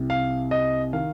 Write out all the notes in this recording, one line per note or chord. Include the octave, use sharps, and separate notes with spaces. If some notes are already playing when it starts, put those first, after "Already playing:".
Already playing: C2 C3
F5
D#5
D#3 F5